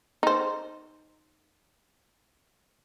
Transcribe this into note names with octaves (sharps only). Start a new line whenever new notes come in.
D#4 C5